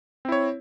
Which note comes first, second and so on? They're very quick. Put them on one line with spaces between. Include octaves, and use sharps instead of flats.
C4 E4 C#5